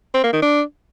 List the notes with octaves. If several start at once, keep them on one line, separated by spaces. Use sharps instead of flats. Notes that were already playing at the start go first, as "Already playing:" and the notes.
C4
A#3
D#3
D4